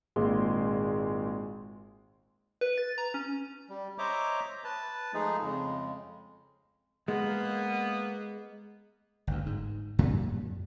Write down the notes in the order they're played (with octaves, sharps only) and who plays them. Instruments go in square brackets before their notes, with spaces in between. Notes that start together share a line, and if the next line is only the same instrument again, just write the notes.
[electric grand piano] G#1 A#2 G#3 C6
[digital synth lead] B4
A6
A#5
C#4
[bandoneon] G3
C5 C#5 D#5 E5 A#5 D6
B4 A5
F3 G#3 A3 D#4 G#4
F2 C#3 G#3
[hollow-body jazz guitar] G#3 [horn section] A#3 B3
[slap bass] G1 D2
G#2
F#2 A#2 F#3 G3